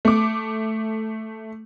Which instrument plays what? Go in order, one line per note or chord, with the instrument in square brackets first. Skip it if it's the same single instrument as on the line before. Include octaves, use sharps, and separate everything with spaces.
[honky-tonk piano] A3 D6